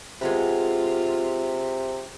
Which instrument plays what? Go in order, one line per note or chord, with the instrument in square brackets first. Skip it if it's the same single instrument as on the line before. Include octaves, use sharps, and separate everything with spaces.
[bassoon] C3 [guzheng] G#3 B3 B4 [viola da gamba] F4